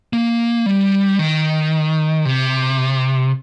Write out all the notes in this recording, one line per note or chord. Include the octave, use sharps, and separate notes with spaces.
A#3
G3
D#3
C3